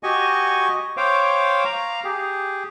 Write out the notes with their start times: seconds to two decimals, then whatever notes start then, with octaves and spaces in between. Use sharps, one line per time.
0.03 F#4 G4 D#5 G#5 C#6
0.97 C5 C#5 F5 G5 D6
1.65 F5 A#5
2.04 G4 G#4